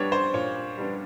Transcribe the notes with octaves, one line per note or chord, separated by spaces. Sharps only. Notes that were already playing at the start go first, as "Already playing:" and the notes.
Already playing: G3 B3 D4 C#5
C5
A#2 C#5
G3 B3 D4